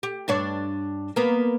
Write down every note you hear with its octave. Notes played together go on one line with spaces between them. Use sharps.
G4
G2 D4 C#5
A#3 B3